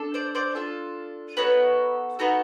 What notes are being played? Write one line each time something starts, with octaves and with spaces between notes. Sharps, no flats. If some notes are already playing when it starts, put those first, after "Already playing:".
Already playing: D4 A4
C5 D5
C5 D5
D4 F4 A4
B3 D#4 F#4 A4 B4 C#5
B3 D#4 F#4 A4